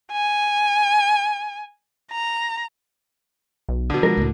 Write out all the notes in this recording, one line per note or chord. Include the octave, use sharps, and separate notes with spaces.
G#5
A#5
B1
B2 D3
F3 G#3 A#4
C#2 A2